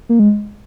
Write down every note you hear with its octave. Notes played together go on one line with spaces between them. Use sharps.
A#3
G#3